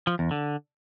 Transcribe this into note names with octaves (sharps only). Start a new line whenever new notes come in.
F3
E2
D3